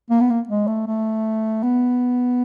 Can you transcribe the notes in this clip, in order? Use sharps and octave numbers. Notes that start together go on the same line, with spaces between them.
A#3
B3
A#3
G#3
A3
A3
B3